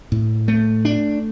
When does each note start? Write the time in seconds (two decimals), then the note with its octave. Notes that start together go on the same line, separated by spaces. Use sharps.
0.12 A2
0.48 A3
0.85 D4